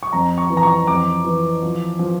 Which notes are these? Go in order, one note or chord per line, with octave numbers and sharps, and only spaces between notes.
C#6
F2 A#5
C#6
E3
A#5
C#6
F2 D6
E3
F3
F3